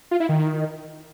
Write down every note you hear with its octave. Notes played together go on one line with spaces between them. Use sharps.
F4
E4
D#3